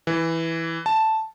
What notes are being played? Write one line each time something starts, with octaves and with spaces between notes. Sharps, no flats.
E3
A5